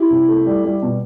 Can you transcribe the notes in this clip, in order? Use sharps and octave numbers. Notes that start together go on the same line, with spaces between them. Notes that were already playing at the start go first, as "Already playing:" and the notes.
Already playing: E4 G4
C2
A3
G3
G3
B2